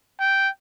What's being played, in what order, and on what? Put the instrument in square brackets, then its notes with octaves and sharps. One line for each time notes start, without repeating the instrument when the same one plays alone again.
[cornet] G5